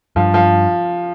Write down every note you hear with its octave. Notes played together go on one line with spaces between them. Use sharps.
G2 F3
F3